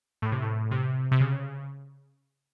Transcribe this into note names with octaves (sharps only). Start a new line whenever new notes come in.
A2
C3
A2
C3
C3
C#3